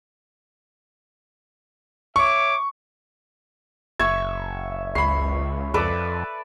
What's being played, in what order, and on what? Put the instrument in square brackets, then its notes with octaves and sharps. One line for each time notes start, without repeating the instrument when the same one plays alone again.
[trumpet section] C#5 E5 D6 [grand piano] C#6
[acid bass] F#1 [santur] E5 C#6 [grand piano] G#6
[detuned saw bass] C#2 [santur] C#5 [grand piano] B5 C7
[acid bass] F2 [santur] A4 B4 D5